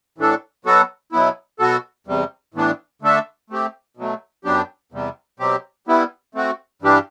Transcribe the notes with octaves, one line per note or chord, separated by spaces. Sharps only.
A2 E3 A3 D4 A4
B2 F#3 B3 F#4 A4
B2 F#3 B3 E4
B2 F#3 B3 F#4 A4
E2 C3 G3
A2 E3 B3 D4
D3 A3 D4 A4 E5
A3 C4 G4
B2 F#3 A3
F#2 F#3 B3 D4 G4
E2 C3 G3
B2 F#3 C4 G4
G3 B3 E4
A3 C4 F#4
G2 E3 G3 D4 G4